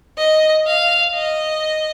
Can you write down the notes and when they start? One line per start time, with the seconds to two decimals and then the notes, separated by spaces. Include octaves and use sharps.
0.18 D#5
0.67 F5
1.15 D#5